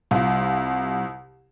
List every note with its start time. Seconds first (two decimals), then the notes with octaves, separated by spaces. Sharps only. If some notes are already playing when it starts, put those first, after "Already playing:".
0.11 C2 F4